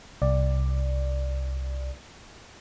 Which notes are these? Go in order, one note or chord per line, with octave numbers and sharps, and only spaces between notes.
C2 D5